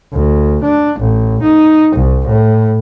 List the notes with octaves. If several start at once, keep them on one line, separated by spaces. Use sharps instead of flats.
D2
D4
A1
D#4
C2
A2